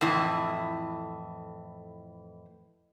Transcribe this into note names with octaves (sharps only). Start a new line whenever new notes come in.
F2 A2 E3